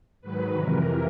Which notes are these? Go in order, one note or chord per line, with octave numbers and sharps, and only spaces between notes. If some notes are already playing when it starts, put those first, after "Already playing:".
G#2 D#3 F#3 B4
F2 C3 E3 A#4